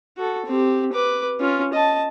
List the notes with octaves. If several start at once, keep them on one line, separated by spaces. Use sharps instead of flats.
F#4 A4
C4 G4
B4 D6
C#4 F4
D#5 A5